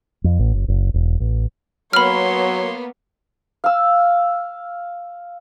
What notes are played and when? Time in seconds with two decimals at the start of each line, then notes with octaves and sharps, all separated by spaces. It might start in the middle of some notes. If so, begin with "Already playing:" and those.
0.24 F2
0.39 A1
0.54 F#1
0.68 F#1
0.94 E1
1.20 A1
1.93 F#3 A#3 B3 C#5 B5 C6 F6
3.64 F5 E6